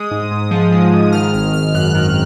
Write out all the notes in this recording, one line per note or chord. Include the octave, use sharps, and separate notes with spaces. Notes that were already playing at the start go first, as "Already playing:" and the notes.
Already playing: G#3 D#6
G#2
G#2
F3
G#3
G#2
D#3 F6
G#1 F6
G#1 F6
F#2 F#6
D#3